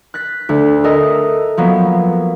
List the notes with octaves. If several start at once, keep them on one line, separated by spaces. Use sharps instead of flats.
F#6 A6 B6
D2
A4 A#4 D#5 E5
F3 F#3 A#3 B3